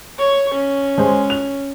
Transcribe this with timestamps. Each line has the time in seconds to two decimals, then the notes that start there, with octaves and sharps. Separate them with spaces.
0.18 C#5 C#6
0.54 C#4
0.98 G#3 G#4 C5
1.30 F7